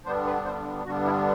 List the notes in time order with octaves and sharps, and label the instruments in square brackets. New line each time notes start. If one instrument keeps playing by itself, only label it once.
[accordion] G2 D3 G3 B3 D4 C5
B4
C5
G2 D3 G3 B3 D4 F#4
E4